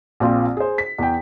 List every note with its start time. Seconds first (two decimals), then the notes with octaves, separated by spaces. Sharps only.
0.20 A#1 C4 F4
0.57 G#4 C5
0.78 B6
0.98 E2 G5